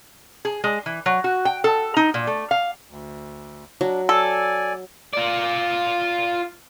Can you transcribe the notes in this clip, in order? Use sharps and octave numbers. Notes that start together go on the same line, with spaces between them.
G#4
G#3
E3
F#3
F#4
G5
A4
D#4
A#2
A3
F5
D2
F#3 D4
A4 D5 G#5
F4 D5